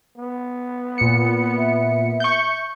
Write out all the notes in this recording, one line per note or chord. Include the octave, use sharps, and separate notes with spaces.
B3
A#2 C#7
E5
C#6 G6